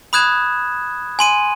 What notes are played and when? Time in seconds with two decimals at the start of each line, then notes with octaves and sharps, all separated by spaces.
0.13 B5 D#6 F#6 G#6 E7
1.19 G#5 C6 D#7